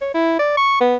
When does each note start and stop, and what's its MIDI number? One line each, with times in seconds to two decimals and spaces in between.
0.01 0.12 73
0.14 0.35 64
0.39 0.54 74
0.57 0.80 85
0.81 0.96 59